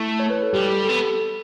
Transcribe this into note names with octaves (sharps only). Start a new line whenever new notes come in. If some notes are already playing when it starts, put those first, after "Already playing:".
Already playing: A3 E4
C#5
B4
A4
G3 G4
G4
B3 A4